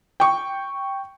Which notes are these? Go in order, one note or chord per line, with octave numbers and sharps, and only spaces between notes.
G5 C#6